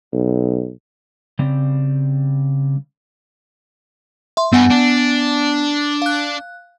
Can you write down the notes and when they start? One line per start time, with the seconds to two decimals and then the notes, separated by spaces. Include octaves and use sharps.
0.12 B1
1.39 C#3 G3 C4
4.37 E5 C6
4.53 G2 B3 F#5 G#5
4.71 D4
6.02 F5 F#6